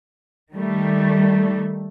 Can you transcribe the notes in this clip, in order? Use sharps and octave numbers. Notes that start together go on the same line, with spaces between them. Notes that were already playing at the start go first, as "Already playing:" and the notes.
D#3 G3 A3